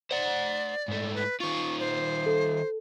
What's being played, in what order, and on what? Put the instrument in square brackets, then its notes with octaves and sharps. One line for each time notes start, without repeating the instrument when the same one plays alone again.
[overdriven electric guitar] C5 F#5 [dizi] D5
[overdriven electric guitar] G#2 A3
[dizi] B4
[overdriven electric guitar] D#3 F4 [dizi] C#6
[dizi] C5
[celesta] A4